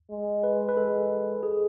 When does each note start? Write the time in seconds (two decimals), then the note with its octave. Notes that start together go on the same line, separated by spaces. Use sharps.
0.10 G#3
0.44 B4
0.69 B4
0.77 G#3 A4
1.43 G#4